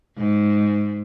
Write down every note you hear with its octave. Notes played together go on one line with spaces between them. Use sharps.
G#2